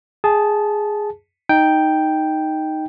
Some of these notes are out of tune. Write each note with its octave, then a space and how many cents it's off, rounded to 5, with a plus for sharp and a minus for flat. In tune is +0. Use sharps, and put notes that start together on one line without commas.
G#4 +0 A5 -15
D#4 +0 G5 +0